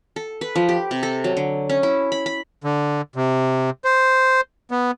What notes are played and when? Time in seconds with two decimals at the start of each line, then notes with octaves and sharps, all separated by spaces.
0.16 A4
0.41 B4
0.56 F3
0.69 G4
0.91 C3
1.03 A4
1.24 F#3
1.37 D3
1.69 C#4
1.83 E4
2.12 B5
2.26 B5
2.64 D3
3.16 C3
3.85 C5
4.71 B3